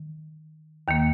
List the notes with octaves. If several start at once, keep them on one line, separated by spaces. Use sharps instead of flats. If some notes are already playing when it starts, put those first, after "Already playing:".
Already playing: D#3
D#2 D#3 A#3